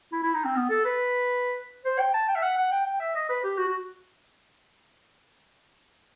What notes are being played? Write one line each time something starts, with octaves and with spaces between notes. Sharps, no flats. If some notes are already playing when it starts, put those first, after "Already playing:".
E4
E4
D#4
C4
B3
A4
B4
C5
G5
A5
G5
E5
F#5
F#5
G5
G5
E5
D#5
B4
G4
F#4
F#4